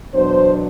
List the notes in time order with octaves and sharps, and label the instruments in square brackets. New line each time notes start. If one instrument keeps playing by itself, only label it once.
[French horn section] E2 B2 F#3 B3 D4 C5